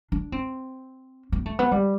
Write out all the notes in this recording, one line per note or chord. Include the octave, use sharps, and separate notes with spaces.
D4
C4
B3
A3
B3
G3